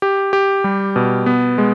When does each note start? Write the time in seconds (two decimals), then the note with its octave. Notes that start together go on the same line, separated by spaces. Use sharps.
0.02 G4
0.33 G4
0.64 G3
0.96 B2
1.26 B3
1.58 G#3